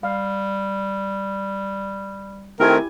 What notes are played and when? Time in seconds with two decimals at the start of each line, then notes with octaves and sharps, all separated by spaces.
0.03 G3 F5
2.60 D#3 A3 C4 E4 G4 A#4 G#5